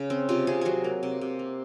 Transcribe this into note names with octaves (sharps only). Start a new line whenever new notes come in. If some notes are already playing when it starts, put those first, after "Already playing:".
Already playing: C#3
C4
C3 F4
C3 G#4
F#3 F#4 G#4
A#3
C3
C3
A#3